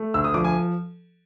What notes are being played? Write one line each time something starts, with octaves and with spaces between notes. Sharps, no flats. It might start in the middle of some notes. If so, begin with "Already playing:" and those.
Already playing: A3
D2 E6
D#6
F3 D6
G#5